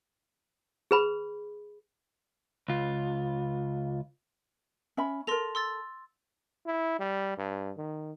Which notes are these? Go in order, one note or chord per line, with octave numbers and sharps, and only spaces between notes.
G#4 B4 B5
C#2 F4
C#4 E5 B5
A4 A#4 C6 A#6 F7
C6 E6 A6
E4
G3
G2
D#3